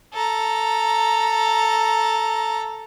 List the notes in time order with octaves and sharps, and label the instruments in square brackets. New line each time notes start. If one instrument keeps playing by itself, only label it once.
[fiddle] A4 A#5